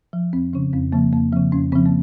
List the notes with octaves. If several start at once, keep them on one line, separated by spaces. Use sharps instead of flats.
F3
F2 C4
C#3 F3 C#4
F2 C4
C#3 F3 A#3
F2 A#3
C#3 F3 C4
F2 C#4
C#3 F3 C4
A#3